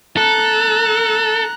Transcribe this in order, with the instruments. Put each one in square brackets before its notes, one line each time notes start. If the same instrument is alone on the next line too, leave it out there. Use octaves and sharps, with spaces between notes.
[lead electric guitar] A4 [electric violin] A#5 F#6